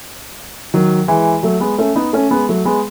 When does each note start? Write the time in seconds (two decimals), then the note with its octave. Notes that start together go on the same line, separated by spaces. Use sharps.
0.74 D#3 F#3
1.08 E3 G#3
1.43 F#3 A3
1.60 G#3 B3
1.78 A3 C#4
1.96 B3 D#4
2.13 A3 C#4
2.31 G#3 B3
2.49 F#3 A3
2.65 G#3 B3